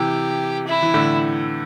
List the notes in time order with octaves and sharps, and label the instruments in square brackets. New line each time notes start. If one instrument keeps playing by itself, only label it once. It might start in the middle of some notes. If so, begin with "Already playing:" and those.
Already playing: [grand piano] C3 E3 [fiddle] G4
[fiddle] E4
[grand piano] E3
A2 D3